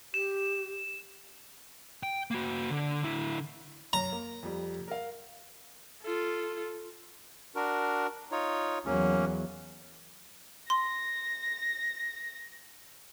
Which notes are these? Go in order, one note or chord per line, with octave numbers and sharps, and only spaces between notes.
G4 E7
G5
A#3 F#4
D3
D3 E4
F#2 A#5
A#3
F2 G3
A#4 F5
F4 A4
D4 F#4 A#4
D#4 F4 C#5
E2 F#3 A#3 C#4
C6 A#6